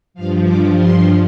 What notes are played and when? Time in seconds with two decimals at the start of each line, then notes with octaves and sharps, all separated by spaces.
0.14 G2 F3 F5
0.45 D6
0.76 C6